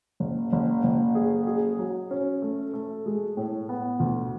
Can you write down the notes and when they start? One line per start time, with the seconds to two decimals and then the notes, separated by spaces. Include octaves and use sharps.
0.20 F#1
0.52 F#1
0.84 F#1
1.15 G#4
1.47 G#4
1.79 F#3
2.11 C#4
2.42 A3
2.74 A3
3.06 G#3
3.37 A2
3.69 B3
4.00 D2